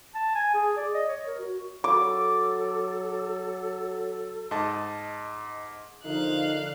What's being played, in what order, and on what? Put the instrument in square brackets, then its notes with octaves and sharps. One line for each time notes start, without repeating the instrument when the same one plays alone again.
[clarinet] A5
G#5
G#4
D5
D#5
C#5
A#4
F#4
[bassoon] F#3 [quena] A4 [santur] D6
[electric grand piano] G#2 D#5 A5
[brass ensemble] D3 [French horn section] F3 A#4 D#5 [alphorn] D#4 [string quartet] F5 F#6